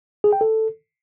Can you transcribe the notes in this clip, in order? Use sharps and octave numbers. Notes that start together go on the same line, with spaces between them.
G#4
G5
A4